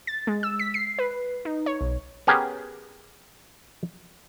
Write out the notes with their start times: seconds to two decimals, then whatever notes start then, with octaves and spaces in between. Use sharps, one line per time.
0.07 A6
0.27 G#3
0.43 E6
0.59 B6
0.74 C7
0.99 B4
1.45 D#4
1.66 C#5
1.81 B1
2.27 B3 C#4 G4 G#4 A#4